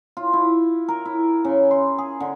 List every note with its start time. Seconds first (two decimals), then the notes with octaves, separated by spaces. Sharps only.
0.17 F4
0.33 E4
0.88 A#4
1.05 E4
1.45 C#3
1.71 C6
1.98 G#4
2.20 D3